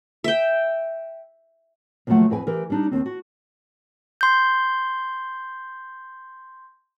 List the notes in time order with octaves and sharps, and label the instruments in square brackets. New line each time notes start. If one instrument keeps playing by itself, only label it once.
[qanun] E5 G5
[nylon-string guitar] D#2 C#3 F3 F#3 A3 F#5
F2 G#4 B4 G5 G#5
E3 G4 A#4
G3 D4 D#4
D#2 C4
F#4
[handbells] C6 G6